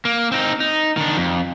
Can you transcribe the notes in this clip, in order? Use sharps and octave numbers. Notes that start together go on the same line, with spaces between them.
A#3
C4 D#4
D#4
D#3 D4
F2